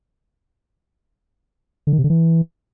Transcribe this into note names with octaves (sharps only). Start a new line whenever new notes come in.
D3
D#3
C3
D3
E3